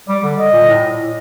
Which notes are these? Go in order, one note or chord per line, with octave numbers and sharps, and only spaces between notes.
G3 D5
D3
D#5
A#2
A2